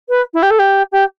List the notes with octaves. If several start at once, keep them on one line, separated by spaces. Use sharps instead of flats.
B4
E4
G4
A4
G4
G4